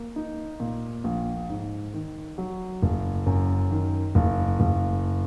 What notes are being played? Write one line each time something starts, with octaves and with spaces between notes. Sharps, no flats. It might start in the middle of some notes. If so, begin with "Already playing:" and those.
Already playing: A#3
D#4
A#2
A#1
G#2
D#3
F#3
F#1
F#2
D#3
F#1
F#1